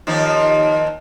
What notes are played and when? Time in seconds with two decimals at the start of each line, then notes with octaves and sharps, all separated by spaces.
0.07 D#2 F3 D#4